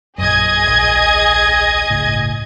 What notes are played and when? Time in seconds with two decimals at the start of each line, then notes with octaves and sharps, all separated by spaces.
0.18 A#1 F#2 G#4 D#5 G#6
0.65 D1 A#1
1.90 G1 C#2 A2